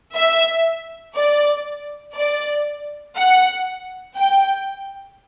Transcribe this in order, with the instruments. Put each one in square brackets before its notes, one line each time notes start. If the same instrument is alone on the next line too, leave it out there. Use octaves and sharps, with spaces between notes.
[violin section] E5
D5
D5
F#5
G5